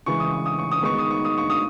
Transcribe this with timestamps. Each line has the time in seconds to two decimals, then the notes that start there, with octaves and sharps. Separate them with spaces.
0.06 C#3 E3 G#3 C#6
0.20 D#6
0.32 C#6
0.46 D#6
0.59 C#6
0.72 D#6
0.82 D#3 G#3 B3 D#4 C#6
0.98 D#6
1.11 C#6
1.25 D#6
1.38 C#6
1.50 D#6